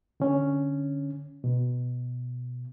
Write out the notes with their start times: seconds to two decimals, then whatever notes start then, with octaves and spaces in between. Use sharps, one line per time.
0.20 D3 C#4
1.44 B2